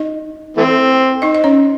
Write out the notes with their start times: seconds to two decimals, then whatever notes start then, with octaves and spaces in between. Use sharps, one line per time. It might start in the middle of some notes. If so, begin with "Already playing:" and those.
Already playing: D#4 D#5
0.57 E3 A3 C4
1.22 D#4 D#5
1.35 D#5
1.44 C#4 C#5